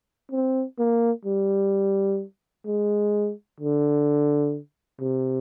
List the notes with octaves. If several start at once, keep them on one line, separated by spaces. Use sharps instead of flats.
C4
A#3
G3
G#3
D3
C3